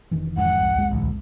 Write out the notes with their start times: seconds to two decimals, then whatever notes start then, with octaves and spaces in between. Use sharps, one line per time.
0.11 F1 D#3 E3
0.37 F2 G#2 F#5
0.61 C2
0.75 C2 F2 G#3
0.91 A1 D2